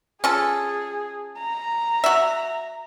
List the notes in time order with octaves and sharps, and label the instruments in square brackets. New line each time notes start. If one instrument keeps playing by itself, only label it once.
[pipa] C#4 F4 A4 [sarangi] G#4
[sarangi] A#5
[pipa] F#4 E5